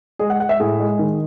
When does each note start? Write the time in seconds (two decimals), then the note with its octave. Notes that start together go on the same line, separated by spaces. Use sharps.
0.19 G#3 G#4
0.30 F#5
0.40 G#3 F#5
0.49 E5
0.60 A2 G#4
0.80 G#3
0.99 D#3